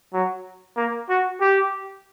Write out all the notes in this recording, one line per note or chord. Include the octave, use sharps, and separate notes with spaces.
F#3
A#3
F#4
G4